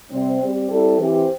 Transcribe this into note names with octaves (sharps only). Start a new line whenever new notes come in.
C3 G3 C4
G3 C4 G4
G3 C4 E4 A4
E3 C4 G4 C5